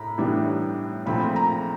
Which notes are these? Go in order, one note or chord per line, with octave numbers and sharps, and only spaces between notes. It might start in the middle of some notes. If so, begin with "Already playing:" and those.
Already playing: A2 A#5 B5
A2 E3 G3 B3 D4
A#2 F3 A3 C4 B5
A#5